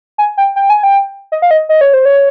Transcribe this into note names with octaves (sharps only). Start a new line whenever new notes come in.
G#5
G5
G5
G#5
G5
D#5
F5
D#5
D#5
C#5
C5
C#5